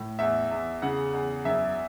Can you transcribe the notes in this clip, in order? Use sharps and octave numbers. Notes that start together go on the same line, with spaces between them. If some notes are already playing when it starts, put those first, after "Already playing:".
Already playing: A2
E2 E5
E2
C#3 F#5
E2
F#2 E5